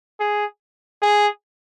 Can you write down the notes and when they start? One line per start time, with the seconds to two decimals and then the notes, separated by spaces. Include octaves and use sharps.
0.20 G#4
1.03 G#4